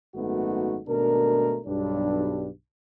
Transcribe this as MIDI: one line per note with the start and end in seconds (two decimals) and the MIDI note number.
0.15 0.78 32
0.15 0.78 42
0.15 0.78 57
0.15 0.78 59
0.15 0.78 63
0.15 0.78 66
0.88 1.59 32
0.88 1.59 47
0.88 1.59 57
0.88 1.59 62
0.88 1.59 70
1.65 2.48 35
1.65 2.48 43
1.65 2.48 62